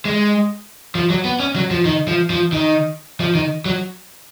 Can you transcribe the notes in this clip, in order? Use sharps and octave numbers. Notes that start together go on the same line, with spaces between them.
G#3
F3
F#3
B3
C#4
F#3
F3
D#3
F3
F3
D#3
F3
D#3
F#3